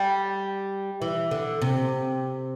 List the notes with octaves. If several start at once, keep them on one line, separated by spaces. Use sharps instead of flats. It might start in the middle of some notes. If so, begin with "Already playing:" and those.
Already playing: G3
E3
D3
C3